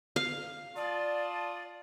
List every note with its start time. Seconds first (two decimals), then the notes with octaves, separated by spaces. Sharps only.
0.16 F5
0.76 F4 D5 A5 D#6